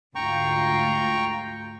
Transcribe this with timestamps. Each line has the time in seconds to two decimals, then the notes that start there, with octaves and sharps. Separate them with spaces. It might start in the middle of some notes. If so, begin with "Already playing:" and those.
0.15 D2 G#2 F4 G5 A#5 C#6